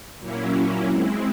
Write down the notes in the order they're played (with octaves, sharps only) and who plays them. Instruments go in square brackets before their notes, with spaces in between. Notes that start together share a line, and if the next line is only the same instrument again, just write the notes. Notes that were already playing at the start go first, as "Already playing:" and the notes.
[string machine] A#2 F#3 A#3 C#4 E4
G#3 C4 E4